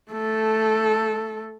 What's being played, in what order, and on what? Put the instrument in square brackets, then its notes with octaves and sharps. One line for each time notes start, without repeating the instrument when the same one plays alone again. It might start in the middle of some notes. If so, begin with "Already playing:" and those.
[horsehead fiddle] A3 A4